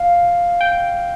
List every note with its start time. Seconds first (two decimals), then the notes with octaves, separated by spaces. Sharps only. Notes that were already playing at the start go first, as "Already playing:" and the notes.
Already playing: F5
0.61 G5